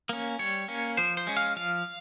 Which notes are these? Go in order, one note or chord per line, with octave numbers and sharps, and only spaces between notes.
A#3 C#4
G3 C#5
A#3 C#4
F3 C5
C5
G#3 C#4
F5
F3 F5